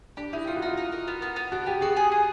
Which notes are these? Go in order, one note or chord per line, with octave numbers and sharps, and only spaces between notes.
D4 G4
D#4 E4
D#4 F4
F#4
D#4 F4
D#4
A#4
B3
B3
B3
D4 F#4
B3 G4
F#4 G#4
G#4
G#4